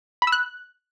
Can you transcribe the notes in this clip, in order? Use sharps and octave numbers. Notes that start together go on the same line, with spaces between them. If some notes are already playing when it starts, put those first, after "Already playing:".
B5
E6
F#6